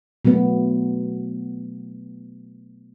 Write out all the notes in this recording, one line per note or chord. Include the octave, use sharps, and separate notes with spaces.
B2 F#3 A3 B3